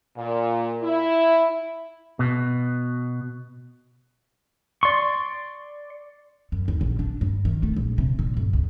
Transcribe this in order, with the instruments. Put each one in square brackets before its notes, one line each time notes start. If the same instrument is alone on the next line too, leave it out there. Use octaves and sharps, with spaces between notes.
[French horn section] A#2
E4
[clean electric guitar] B2
[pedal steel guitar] D5 C6 C#6
[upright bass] F#2
D#2
A#1
D4
G2
D#3
A3
A#1
C3
A#2
G1
C#2